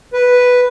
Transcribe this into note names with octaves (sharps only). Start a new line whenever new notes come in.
B4